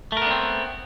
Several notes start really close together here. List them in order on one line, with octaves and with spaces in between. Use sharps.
A3 A#4 B3 D4 C4